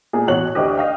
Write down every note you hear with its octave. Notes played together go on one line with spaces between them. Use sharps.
A#2 G#4
A1 B2 F#4 C#5 F#6 F#7
D2 D4 G4 D#5
D#5 F5 G5